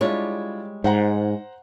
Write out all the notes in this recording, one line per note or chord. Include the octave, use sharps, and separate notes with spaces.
G3 G#3 D4 E4 F4 C#5
G#2 C5 F#5 A#5